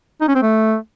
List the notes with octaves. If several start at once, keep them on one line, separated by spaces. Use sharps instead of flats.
D#4
C#4
C4
A3